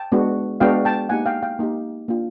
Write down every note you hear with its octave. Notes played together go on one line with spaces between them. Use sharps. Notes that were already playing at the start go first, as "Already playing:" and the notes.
Already playing: G5 A5
G#3 B3 D4 F#4
G#3 B3 D4 F#4 F5 G5
G5 A5
A#3 D#4 G4 F#5 G#5
F5 G5
F5 G5
A#3 D#4 G4
A#3 D4 F4